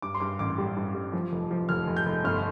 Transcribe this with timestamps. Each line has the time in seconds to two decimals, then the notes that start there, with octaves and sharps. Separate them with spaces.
0.02 G2 D6
0.14 C6
0.20 G2 D6
0.39 A1 D6
0.58 G3
0.76 G2
0.94 G3
1.13 F3
1.32 F1
1.51 F3
1.69 F1 F6
1.87 F1
1.97 G6
2.06 F1
2.24 G1 F6